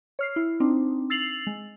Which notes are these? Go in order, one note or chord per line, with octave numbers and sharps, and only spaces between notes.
C#5 F6 C7
E4
C4 D4 D#4
E6 A6 C7 F7 F#7
G#3